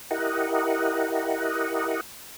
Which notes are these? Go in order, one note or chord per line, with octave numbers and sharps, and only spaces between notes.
E4 G4 A#4 D#5 F#5